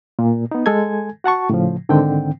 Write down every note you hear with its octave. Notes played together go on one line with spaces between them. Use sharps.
A#2
B3 D#4
G#3 A4 G#5 G#6
F#4 F#5 A5 C#6
A2 C#3 F3
G#2 D3 D#3 C4 G5